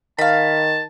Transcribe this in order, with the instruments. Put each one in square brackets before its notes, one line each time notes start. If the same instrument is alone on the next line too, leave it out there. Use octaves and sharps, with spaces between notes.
[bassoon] D#3 [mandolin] F5 B5 [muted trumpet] A5